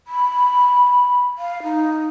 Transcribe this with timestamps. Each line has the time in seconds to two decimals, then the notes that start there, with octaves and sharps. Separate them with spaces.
0.07 B5
1.38 F5
1.63 D#4